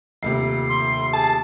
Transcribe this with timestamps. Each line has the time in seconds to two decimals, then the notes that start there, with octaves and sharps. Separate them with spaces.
0.23 D#1 D2 C3 C7
0.69 C6
1.13 G#4 A5